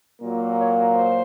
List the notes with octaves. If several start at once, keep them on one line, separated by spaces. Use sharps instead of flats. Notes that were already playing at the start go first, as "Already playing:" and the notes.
A#2 F#3 A#3
C#5
C5